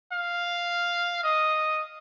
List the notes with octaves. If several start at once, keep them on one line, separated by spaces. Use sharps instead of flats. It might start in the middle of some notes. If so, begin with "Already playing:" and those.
F5
D#5